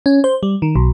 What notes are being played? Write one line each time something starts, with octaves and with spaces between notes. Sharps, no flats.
C#4
C5
G3
D#3
B1